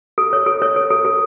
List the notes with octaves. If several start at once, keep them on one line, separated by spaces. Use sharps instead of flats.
A4
C#5
A4
C#5
A4
A4
A4